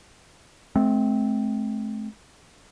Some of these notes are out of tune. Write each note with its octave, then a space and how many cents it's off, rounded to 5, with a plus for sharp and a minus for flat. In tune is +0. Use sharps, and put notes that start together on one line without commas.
A3 -40 C4 +0